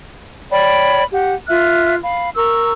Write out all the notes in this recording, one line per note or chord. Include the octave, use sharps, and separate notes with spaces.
C#5 D5 G5 B5
G4 F#5
F4 E5 F6 F#6
F5 B5
A#4 A#5 C#6 E6